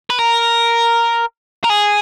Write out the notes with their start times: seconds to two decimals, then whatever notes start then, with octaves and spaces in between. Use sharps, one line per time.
0.10 B4
0.19 A#4
1.64 A#4
1.70 G#4